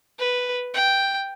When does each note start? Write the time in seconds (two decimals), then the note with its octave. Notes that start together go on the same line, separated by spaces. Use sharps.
0.19 B4
0.74 G5